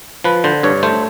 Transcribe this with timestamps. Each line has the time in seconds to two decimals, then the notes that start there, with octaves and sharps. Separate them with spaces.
0.24 F3 B4
0.44 D3 C5
0.63 G2 C#5
0.83 A3 C5